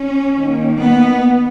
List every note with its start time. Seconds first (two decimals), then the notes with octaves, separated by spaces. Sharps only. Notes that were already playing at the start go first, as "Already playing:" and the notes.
Already playing: C#4
0.35 D#3 A#3
0.81 B3